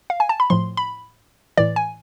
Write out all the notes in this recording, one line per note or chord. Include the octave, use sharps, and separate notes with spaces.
F5
G#5
A5
B5
A2 F3 C6
B5
A2 E3 D5
G#5